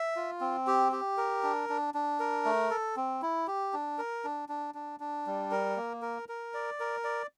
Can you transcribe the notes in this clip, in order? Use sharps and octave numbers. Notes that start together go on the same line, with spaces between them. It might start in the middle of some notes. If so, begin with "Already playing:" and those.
Already playing: E5
F4
C4
G4
G4
A#4
D4
D4
D4
A#4
A3
A4
C4
E4
G4
D4
A#4
D4
D4
D4
D4
G3
A#4
A#3
A#4
A#4
D5
A#4
D5